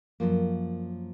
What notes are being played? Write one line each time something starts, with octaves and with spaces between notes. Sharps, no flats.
F#2 F3 A#3